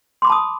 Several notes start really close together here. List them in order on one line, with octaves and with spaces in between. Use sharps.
C6 D6 B5 A5 D#6